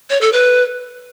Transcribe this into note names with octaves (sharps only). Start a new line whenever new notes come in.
C#5
A4
B4